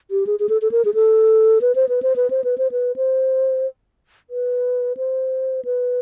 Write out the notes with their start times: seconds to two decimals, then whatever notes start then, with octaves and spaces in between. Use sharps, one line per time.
0.11 G4
0.27 G#4
0.40 G#4
0.49 A4
0.62 A4
0.72 A#4
0.85 G#4
0.94 A4
1.61 B4
1.75 C5
1.89 B4
2.03 C5
2.16 B4
2.30 C5
2.44 B4
2.58 C5
2.71 B4
2.96 C5
4.30 B4
4.97 C5
5.65 B4